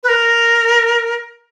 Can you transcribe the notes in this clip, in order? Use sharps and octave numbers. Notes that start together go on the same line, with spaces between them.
B4
A#4